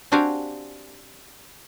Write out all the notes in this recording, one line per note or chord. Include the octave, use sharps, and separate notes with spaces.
C4 D4 F#4 G4 F5 G#5